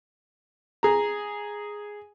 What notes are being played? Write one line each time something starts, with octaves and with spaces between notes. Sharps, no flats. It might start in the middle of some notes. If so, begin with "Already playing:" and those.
G#4 A#5